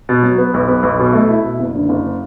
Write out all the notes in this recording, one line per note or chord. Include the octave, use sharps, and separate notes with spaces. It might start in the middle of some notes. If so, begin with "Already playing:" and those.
B2
F#3
B3
B1
B3
B1
B2
A3
E4
B2
F#1
D3
F#1